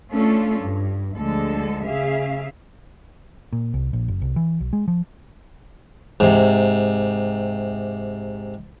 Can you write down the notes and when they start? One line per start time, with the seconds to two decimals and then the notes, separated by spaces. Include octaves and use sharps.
0.12 A3 C#4 D4 F4 A4
0.60 G2
1.16 D2 D3 F3 G#3 A4
1.85 C#3 G#4 E5 F5
3.53 A#2
3.74 C2
3.93 A#1
4.08 F#1
4.21 C2
4.36 E3
4.60 B1
4.73 G#3
4.88 F3
6.20 G#2 C3